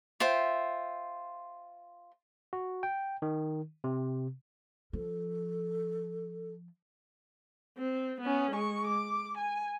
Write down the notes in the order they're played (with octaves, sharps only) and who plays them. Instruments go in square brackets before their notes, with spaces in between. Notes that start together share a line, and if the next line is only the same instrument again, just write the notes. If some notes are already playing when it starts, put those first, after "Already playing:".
[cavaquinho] F4 C5 E5 G5
[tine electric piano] F#4
G5
D#3
C3
[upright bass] F3 [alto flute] A4
[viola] C4
B3 C#4
G#3 C#6
D6
G#5